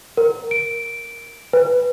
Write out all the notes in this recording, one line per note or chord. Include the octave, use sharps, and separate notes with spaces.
A#4
D7
B4